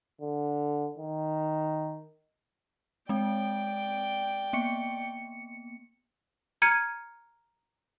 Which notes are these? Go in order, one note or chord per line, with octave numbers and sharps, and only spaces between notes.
D3
D#3
G#3 C4 D5 G5
A#3 B3 C#7
A#5 F6 G#6 C#7 D#7